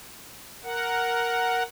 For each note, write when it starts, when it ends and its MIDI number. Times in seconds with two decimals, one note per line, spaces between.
0.63 1.63 70
0.63 1.63 78